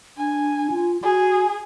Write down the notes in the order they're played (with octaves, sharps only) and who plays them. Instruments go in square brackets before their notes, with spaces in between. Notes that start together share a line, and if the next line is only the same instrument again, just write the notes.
[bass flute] D4 [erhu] G#5
[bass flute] F4
[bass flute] F#4 [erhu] G#4